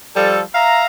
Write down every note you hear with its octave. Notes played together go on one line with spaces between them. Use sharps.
F3 G3 A4
E5 F5 A#5